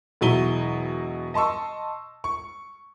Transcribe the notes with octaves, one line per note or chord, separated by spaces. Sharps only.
E1 B2 F#3 E4 D#7 G7
D#5 A5 C6 C#6 E6
C#6